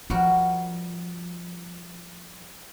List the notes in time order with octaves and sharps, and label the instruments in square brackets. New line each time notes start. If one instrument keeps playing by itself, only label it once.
[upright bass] F3 [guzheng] G3 F#4 A#4